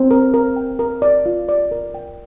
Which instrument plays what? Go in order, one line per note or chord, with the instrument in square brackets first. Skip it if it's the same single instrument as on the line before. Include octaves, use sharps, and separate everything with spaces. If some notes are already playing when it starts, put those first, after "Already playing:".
Already playing: [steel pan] C4
A#4
A#4
G5
A#4
D5
F4
D5
A#4
G5